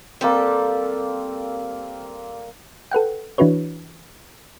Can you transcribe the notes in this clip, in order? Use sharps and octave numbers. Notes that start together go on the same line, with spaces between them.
G3 A#3 C4 A4
A4 B4 F#5 G5
E3 D4 E4 F#4 B4 C#5